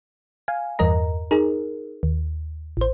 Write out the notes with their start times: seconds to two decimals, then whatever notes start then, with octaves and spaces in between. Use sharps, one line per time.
0.48 F5 G#5
0.79 E2 G2 A#4 D#5 A#5
1.31 D#4 G#4 A#4
2.03 D#2
2.77 A1 C5